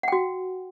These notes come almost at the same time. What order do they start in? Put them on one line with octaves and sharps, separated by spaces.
F#5 G5 F#4